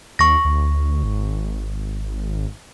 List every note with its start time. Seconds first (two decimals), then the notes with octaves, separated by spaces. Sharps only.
0.19 D#2 C#6 A#6
0.45 D2
1.04 G#1